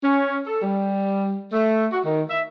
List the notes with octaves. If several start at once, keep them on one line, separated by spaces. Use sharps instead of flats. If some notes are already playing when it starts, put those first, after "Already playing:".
C#4
A4
G3
A3
F#4
D#3
E5